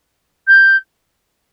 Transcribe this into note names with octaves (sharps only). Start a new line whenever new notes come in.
G6